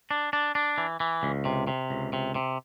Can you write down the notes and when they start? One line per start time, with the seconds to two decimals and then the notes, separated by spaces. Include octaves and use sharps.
0.11 D4
0.33 D4
0.55 D4
0.78 E3
1.00 E3
1.23 C#2
1.45 C3
1.67 C3
1.90 C#2
2.13 C3
2.35 C3